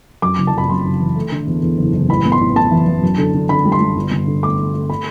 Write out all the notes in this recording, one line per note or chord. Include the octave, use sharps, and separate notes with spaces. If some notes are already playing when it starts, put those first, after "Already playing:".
F#2 D6
F#1
A5
F#1 B5
F#2 C6
F#1
E3
A3
D3
E2
E2
F#1
F#1
A1 B5
B3
C6
A1
B3 A5
E3
E3
F#2
D3
D3
D3 B5
G3
C6
G3
G1
G1
D3
A3 D6
A3
A3
B5